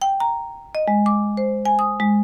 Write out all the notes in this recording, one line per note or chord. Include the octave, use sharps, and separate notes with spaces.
G5
A#5
D#5
G#3
D6
C5
G#5
D#6
G#3